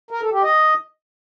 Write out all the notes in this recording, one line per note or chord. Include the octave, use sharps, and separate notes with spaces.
A#4
A4
G4
D#5